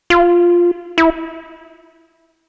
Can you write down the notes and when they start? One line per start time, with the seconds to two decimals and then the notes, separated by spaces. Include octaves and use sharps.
0.10 F4
0.98 E4